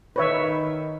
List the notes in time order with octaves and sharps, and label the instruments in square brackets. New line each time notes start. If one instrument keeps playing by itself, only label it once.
[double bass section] D#3 [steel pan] B4 C#5 E5